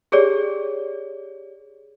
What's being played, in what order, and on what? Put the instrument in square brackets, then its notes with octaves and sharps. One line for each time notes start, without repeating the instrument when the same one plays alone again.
[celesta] G4 G#4 C#5 D5